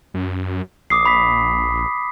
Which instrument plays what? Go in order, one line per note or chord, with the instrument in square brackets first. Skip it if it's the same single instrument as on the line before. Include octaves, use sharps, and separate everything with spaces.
[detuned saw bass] F#2
[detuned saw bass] A#1 [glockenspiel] D6 D#6 C7
[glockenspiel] B5 B6